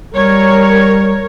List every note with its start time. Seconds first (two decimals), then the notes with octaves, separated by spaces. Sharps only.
0.14 G3 A#4 C#5